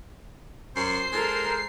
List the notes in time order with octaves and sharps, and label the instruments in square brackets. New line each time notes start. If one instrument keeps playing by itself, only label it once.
[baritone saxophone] F#2 [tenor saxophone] C5 [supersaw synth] C7
[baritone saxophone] G#3 [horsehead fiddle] A4 A#4